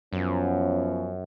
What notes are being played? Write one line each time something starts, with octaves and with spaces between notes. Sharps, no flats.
F#2 F3 B3 C#4